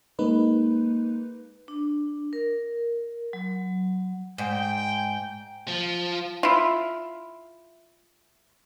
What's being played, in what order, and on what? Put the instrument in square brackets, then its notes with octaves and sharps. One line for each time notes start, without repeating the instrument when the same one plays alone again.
[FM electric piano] G#3 A#3 D#4 B4
[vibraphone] D4
A#4
F#3
[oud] G#2 [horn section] G5
[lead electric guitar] F3
[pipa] E4 F4